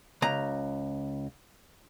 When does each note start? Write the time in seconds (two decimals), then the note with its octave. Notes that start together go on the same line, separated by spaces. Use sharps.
0.22 C#2 A#5